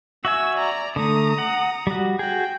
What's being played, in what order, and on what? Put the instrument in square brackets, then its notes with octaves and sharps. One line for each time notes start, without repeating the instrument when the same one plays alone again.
[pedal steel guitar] F#4 E5 G#5 [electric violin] E6
[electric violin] D5 A#5
[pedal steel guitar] D3 A3 [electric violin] A#5 D#6
[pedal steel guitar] F#5
G3 F#4
[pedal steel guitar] F#4 G#4 [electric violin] G5